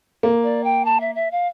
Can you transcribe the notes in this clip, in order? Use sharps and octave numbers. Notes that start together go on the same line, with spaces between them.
A#3
D5
G5
A5
E5
E5
F5